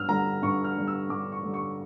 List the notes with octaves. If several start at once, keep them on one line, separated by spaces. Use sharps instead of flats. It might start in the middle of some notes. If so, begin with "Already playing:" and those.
Already playing: G2 E6 F6
D3 G3 A#5
G2 C#6
F6
D3 G3
E6
G2 D6
C#6
D3 G3
C#6